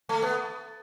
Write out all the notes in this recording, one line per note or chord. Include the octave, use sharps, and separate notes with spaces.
A3
B3